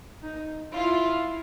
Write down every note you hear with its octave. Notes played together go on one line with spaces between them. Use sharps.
D#4
E4 F4